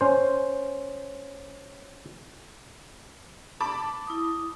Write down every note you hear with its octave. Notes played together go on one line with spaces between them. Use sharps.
C#4 C5
A5 B5 D6
E4 D#6